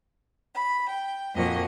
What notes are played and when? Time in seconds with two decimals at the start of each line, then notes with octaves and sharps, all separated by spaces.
0.54 B5
0.89 G5
1.34 F2 A#2 F3 A#3 F#4 D#5